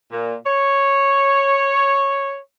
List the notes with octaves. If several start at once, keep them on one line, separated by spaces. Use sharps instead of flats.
A#2
C#5